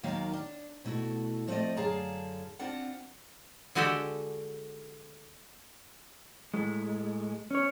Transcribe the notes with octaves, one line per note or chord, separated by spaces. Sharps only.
D#2 D#3 F#3 A#3 F5
D4
B2 A3 E4 F#4
F3 A3 C4 B4 D5 D#5
F#2 D3 G#4 F5 A5 A#5
C4 D4 F4 F#5
D3 G#3 F#4 G4 A4 G5
A2 G#3
C#4 C#5